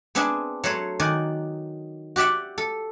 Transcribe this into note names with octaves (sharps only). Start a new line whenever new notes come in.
B3 C4 D4 G#4 E5 G#5
F#3 A3 C5 C#5
D#3 F#4 D5 G#5
F#4 G4 D5 E5 F#5
A4